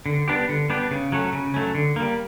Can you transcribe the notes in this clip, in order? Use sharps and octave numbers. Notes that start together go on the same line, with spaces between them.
D3
G3 B3 D4 G4
D3
G3 B3 D4 G4
C#3
F#3 A3 C#4
C#3
F#3 A3 C#4
D3
G3 A#3